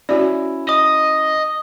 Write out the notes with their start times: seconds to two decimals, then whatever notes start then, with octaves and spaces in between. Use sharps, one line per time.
0.09 C#4 E4 F#4 D5
0.69 D#5 D#6